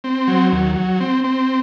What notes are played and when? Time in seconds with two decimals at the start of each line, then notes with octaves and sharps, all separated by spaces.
0.04 C4
0.28 F#3
0.52 D#2
0.76 F#3
1.00 C4
1.24 C4